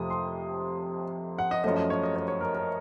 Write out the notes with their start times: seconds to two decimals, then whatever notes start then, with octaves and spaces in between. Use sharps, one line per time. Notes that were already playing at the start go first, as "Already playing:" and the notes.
Already playing: F2 C3 F3 A3 D#6
0.10 C6
1.38 F#5
1.51 D#5
1.64 F#2 F3 A3 D#5
1.77 D#5
1.90 C#5
2.03 D#5
2.16 C#5
2.28 C#5
2.41 A#4
2.54 A#4